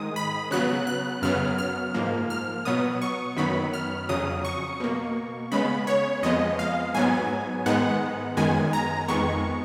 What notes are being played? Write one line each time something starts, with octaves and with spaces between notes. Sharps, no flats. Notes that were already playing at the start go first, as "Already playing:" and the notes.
Already playing: G#2 D#3 G#3 D#6
B5
C#3 F#3 B3 F#6
F#6
F#2 C#3 F#3 B3 F6
F6
G#2 F3 A#3
F6
B2 F#3 B3 D#6
C#6
F#2 D#3 F#3 B3 B5
F6
F2 C#3 F#3 D#6
C#6
B2 A#3
C#3 G#3 B3 B5
C#5
F2 F3 G#3 B3 D#5
F5
G#2 F#3 B3 G#5
G#2 D#3 G#3 B3 F#5
F#2 D#3 G#3 B3 G#5
A#5
F2 D#3 G#3 B3 C#6